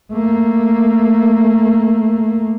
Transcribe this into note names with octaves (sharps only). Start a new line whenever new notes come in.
A3 A#3